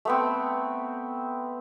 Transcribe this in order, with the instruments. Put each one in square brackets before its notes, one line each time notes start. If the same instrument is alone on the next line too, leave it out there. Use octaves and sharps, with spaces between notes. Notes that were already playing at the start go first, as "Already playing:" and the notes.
[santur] A3 B3 C4